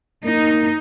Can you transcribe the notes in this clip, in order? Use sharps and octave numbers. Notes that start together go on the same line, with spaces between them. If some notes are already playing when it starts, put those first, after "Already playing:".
A#3 D#4